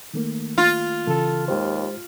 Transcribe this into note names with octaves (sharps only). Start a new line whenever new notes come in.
D#3 A3 A#3
F4
C#3 E3 A4
D#2 G#3 G4 C5